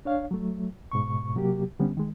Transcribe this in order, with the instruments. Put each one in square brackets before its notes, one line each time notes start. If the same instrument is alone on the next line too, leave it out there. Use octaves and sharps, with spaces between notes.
[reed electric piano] D4 C#5 F5
F#3 A3
G#2 B2 C#6
C3 F#3 A#3 G4
D3 G3 B3 C#4
D#3 G#3